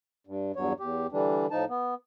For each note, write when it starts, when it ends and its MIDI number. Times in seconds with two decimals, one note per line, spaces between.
0.27 0.52 43
0.56 0.73 40
0.56 0.73 43
0.56 0.73 54
0.56 0.73 73
0.80 1.07 40
0.80 1.07 67
1.12 1.46 50
1.12 1.46 52
1.12 1.46 55
1.12 1.46 62
1.51 1.65 45
1.51 1.65 53
1.51 1.65 63
1.51 1.65 81
1.69 1.94 59